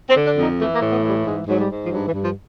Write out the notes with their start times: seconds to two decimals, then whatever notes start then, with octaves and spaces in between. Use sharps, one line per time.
0.10 C4
0.15 D3
0.26 D4
0.37 F2
0.42 D#4
0.59 E3 A3
0.75 A#3
0.82 A2
0.92 B3
1.03 E3 G3
1.25 G#2 G#3
1.47 G#2 F#3
1.59 G3
1.69 G#2
1.86 F3
1.91 G2 F#3
2.08 E3
2.13 G2
2.24 F3